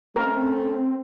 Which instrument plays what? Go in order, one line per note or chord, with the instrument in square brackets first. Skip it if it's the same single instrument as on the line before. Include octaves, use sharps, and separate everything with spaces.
[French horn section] A3 [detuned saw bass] C4 [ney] C#4 [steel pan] A#4